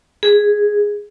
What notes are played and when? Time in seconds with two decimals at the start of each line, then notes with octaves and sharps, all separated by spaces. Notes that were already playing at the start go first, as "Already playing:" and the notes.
0.23 G#4